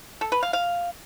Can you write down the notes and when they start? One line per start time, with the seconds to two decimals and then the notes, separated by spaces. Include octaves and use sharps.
0.21 A4
0.32 B4
0.43 F5
0.53 F5